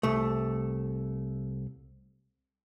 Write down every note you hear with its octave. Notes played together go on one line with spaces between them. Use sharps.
C2 A3